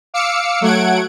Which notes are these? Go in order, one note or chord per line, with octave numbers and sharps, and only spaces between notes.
F5 D6 E6 C#7
F#3 A3 F#5 G#6 D7